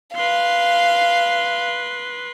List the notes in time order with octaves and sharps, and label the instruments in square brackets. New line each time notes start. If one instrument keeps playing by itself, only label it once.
[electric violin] B4 C6 [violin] F5